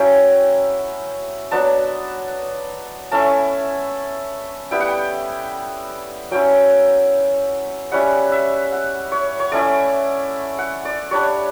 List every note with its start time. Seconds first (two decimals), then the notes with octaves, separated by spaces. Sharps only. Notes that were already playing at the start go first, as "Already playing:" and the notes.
Already playing: F#3 C#4 E4 G5
1.51 F#3 B3 D4 A5
3.12 A3 C#4 E4 A5
4.71 G3 B3 E4 G5
4.80 F#5
4.87 G5
6.31 F#3 C#4 E4 G5
7.92 G3 C#4 E4 F#5
8.32 E5
8.72 F#5
9.12 C#5
9.40 C#5
9.52 A3 C#4 E4 D5
10.59 F#5
10.85 D5
11.11 G3 D4 C#5